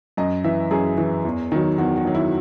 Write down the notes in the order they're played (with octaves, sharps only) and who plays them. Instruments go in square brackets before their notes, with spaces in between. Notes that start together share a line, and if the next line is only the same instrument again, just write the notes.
[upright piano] F#2 D#5
E3 E5
F#2 G#4
E3
E2
D#3 F#3
E2 F#4
F#4
D#3 F#3
E4